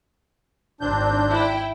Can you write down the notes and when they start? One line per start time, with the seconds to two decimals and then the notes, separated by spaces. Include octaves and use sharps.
0.81 G#1 C4 D4 G6
1.31 E4 G5